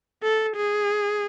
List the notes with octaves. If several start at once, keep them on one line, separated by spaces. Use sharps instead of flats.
A4
G#4